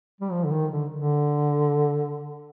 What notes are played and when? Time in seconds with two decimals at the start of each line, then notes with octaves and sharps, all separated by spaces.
0.21 G3
0.31 F3
0.44 D3
0.52 D#3
0.72 D3
0.92 D3